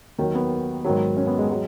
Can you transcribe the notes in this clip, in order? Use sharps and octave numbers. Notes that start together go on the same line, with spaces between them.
D#2 D#3 F#3
B3
G#2 D#3 F#3
C#4
B3
G#3
F#3 G#3